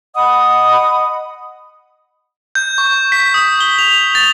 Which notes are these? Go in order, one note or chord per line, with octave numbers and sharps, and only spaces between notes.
D#5 F#5 B5 D#6
G6
C#6
B6
D#6
G7
F7
A6